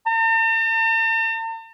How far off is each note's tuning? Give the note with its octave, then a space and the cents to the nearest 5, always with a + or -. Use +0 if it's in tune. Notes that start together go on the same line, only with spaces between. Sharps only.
A5 +45